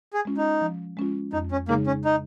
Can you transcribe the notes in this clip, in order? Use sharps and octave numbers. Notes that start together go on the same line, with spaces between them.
G#4
G#3 C#4 F4
D#4
F3
G#3 C#4 F4
F2 D#4
C#4
C#3 G#3 A#3 D#4 G#4
C#4
D#4